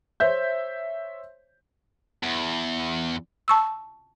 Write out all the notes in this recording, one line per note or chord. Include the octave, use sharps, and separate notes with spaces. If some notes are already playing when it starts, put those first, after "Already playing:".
C5 C#5 E5 G6
E2
A5 C#6 E6